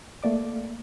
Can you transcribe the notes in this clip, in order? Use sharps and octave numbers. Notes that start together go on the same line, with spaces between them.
A3 A#3 D5 D6